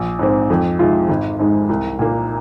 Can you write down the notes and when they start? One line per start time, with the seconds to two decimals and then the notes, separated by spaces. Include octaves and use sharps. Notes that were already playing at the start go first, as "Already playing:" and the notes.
Already playing: A#1
0.19 G#2 D#3 C4
0.50 F2
0.79 C3 D#3 G#3 F4
1.09 G#1
1.39 G#2 D#3 G#3
1.69 C2
1.99 A#2 A#3